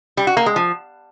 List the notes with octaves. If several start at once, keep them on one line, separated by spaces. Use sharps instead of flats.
G3
F#4
A#3
G#3
F3